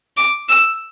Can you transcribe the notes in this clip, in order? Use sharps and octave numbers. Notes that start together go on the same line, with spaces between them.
D6
E6